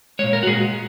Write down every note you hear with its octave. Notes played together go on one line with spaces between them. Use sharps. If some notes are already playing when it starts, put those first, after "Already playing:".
A#2 G#3 C#5
A#4
F#4
A#2 G#3 G#4